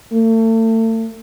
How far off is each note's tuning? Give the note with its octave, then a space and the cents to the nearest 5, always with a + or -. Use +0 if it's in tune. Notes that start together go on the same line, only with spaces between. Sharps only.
A3 +35